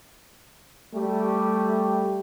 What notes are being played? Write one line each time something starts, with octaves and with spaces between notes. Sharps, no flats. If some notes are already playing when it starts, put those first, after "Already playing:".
G3 A3 G4